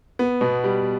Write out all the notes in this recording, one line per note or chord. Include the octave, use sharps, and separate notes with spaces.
B3
B2
G3